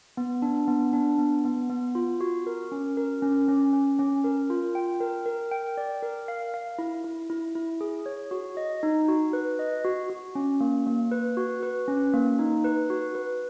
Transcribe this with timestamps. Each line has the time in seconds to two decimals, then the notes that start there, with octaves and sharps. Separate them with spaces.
0.17 B3
0.42 D4
0.68 B3
0.93 D4
1.18 B3
1.45 B3
1.70 B3
1.95 F4
2.21 F#4
2.47 A#4
2.72 C#4
2.97 A#4
3.22 C#4
3.48 C#4
3.73 C#4
3.99 C#4
4.24 A#4
4.50 F4
4.75 G5
5.00 A#4
5.26 A#4
5.51 G5
5.77 D5
6.02 A#4
6.28 F5
6.54 F5
6.79 E4
7.04 E4
7.30 E4
7.55 E4
7.81 G#4
8.06 C#5
8.31 F#4
8.57 D#5
8.83 D#4
9.08 F#4
9.33 B4
9.59 D#5
9.85 F#4
10.10 F#4
10.35 C#4
10.60 A#3
10.86 A#3
11.11 B4
11.37 F#4
11.63 B4
11.88 C#4
12.14 A#3
12.39 D#4
12.64 B4
12.90 F#4
13.15 B4